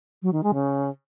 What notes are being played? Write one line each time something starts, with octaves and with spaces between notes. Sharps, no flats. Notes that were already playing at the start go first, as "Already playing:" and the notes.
F#3
D#3
G#3
C#3